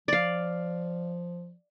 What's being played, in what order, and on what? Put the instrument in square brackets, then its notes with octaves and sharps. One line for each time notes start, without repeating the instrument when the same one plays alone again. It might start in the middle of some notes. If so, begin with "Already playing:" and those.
[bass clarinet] F3 [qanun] D5 F5